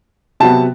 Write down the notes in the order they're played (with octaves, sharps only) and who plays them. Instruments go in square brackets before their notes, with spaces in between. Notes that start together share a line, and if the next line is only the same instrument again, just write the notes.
[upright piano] C3 F#3 B3 A5